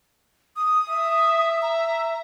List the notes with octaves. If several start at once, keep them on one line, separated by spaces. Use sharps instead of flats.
D#6
E5
A#5